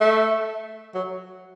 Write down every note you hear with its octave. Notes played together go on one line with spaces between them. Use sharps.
A3
F#3